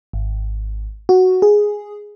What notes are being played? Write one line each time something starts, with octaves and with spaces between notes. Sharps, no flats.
G#1
F#4
G#4